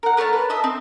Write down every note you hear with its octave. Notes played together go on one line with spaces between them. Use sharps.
A#4 F#5
A3 A#4 C#5 A5
B4
D#5 E5 A5 D#6
C4